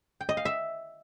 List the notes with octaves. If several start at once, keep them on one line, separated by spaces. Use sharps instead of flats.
G5
D#5
F5
E5